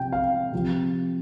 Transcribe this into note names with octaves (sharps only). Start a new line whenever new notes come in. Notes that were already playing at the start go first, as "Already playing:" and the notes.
Already playing: C3 F3 G5
F5
C3 F3